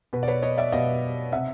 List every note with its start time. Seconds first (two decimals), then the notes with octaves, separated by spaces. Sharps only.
0.13 B2 B4
0.23 D5
0.28 B4 C#5
0.42 C#5 D#5
0.58 D5 E5
0.72 B2 D#5 F5
1.32 C3 E5 F#5